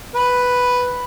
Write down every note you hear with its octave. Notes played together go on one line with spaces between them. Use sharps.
B4